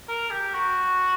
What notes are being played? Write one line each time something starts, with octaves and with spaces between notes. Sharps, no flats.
A#4
G4
F#4